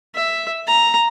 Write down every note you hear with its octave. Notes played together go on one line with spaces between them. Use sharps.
E5
A#5